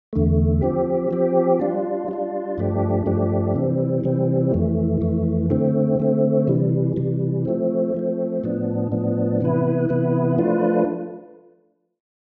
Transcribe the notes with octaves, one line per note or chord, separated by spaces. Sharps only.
E2 D3 A3
F3 C4 G4
F3 C4 G4
G3 D4 F4
G3 D4 F4
G2 F3 A3 D4 G4
G2 F3 A3 D4 G4
C3 E3 G3 C4
C3 E3 G3 C4
F2 E3 A3
F2 E3 A3
D3 A3 C4
D3 A3 C4
C3 E3 G3
C3 E3 G3
F3 A3 C4
F3 A3 C4
A2 F3 B3 D4
A2 F3 B3 D4
C3 E3 B3 E4 B4
C3 E3 B3 E4 B4
F3 A3 D4 F4 B4